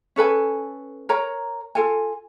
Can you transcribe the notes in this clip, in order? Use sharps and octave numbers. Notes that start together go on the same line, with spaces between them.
C#4 A4 B4 G#5
A#4 C#5 A#5
F4 A4 G#5